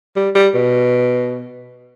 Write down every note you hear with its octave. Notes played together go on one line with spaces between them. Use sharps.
G3
G3
B2